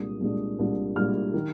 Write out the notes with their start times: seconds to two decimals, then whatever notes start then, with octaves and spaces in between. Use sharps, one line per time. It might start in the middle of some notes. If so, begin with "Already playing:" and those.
Already playing: C2 A#2 G#3 D4 D#6
0.20 C2 A#2 G#3 D4
0.59 C2 A#2 G#3 D4
0.96 C2 A#2 G#3 D4 F6
1.34 D#3